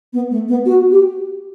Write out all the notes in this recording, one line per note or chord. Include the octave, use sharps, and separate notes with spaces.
B3
A3
B3
F#4
G4